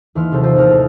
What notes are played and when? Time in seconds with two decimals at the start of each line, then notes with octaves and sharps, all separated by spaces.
0.15 D#2 E3 C6 F6
0.32 C3 F#3 D#4 A4 A#4 C5
0.43 D#4 F4 C5 E6 A6
0.56 A1 D#2 A#3 A#4 D#6 F6
0.70 A4 C5